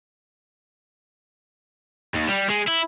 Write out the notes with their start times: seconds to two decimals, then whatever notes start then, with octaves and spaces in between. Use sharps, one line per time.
2.15 D#2
2.29 G3
2.50 G#3
2.68 E4